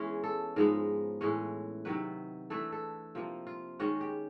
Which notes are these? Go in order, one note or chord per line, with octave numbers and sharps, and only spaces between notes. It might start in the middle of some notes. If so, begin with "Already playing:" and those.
Already playing: E3 G#3 B3 C#4 G#4
A4
G#2 F3 G#3 B3 A#4
A2 E3 G#3 C#4
C3 D#3 F#3 B4
E3 A3 D4 A4
A4
C3 F3 A#3 F4
F4
D#3 G#3 C#4 F#4
G4